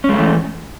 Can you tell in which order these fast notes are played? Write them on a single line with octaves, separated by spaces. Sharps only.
C#4 G#3 A3 E3